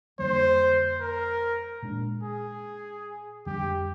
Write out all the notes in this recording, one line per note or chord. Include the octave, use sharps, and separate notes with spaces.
F2 D3 G3 A#3 C5
A#4
A#2 G#3 D4
G#4
F2 D3 G3 G4